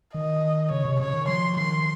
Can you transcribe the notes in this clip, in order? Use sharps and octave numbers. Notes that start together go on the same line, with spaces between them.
D#3 D#5
C#3 C#5
C3
C#3 C#5
D#3
F3 C6
D#3 C6